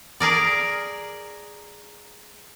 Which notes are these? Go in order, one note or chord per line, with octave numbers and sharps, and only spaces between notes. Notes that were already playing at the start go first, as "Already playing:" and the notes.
G#4 A#4 D5